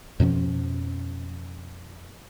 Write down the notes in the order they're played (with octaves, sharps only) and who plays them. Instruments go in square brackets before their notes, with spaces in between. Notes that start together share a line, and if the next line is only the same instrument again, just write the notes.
[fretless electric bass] F2 B2 F3 C#4